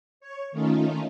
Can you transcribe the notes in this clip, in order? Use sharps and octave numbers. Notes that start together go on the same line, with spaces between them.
C#5
D#3 A3 C#4 D#4 F4